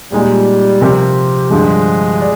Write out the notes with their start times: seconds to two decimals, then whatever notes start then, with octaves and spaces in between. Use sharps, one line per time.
0.12 A#2 G3 G#3 D#4 G#4
0.81 C3 F3 C4 G4 A#4
1.50 G2 D3 F3 G#3
2.20 D5